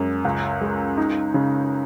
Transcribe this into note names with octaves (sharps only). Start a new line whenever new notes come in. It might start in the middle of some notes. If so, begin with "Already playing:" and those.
Already playing: F#2 G#3
C#2
G#3
D#4
C#3